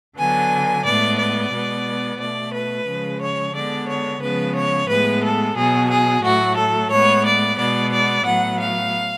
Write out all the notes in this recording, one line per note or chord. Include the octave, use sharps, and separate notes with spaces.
D3 F#3 B3 G#5
A2 G#3 B3 D5
D5
B2 G#3 B3
B2 A3 D5
B4
C#3 F3 G#3
C#5
D3 G#3 B3 D5
C#5
C#3 F3 G#3 B3 B4
C#5
A2 G#3 B3 B4
A4
B2 F#3 B3 G#4
G#4
A2 F#3 A3 F#4
A4
A2 G#3 B3 C#5
D5
B2 G#3 B3 D5
D5
A2 F#3 B3 F#5
F5